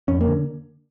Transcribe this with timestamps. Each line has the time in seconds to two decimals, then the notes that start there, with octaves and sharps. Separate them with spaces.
0.08 F2 C#4
0.21 A#3
0.27 D3